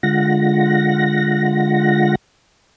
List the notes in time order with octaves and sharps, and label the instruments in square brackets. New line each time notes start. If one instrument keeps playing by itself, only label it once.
[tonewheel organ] D3 G#3 F4 F#5 A#6